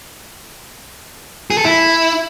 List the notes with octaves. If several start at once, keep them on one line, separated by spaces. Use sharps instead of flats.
G#4
A4
E4